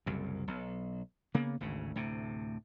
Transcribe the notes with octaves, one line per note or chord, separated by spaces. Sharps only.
F#1 C2 F#2
B1
C#3 A#3 B3
G#1 D2 C#3
D2 A2 C3